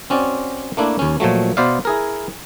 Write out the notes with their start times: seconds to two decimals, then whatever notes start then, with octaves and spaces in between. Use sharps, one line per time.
0.10 C4 C#4 F#4 D5
0.77 A3 A#3 D4 E4
0.99 D#2 C#4
1.20 A#2 F3 F#3 A3
1.57 B2 B3 C5 D5 E5 F5
1.85 E4 G#4 A#4